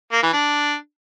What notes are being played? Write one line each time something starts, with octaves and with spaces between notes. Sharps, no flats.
A#3
E3
D4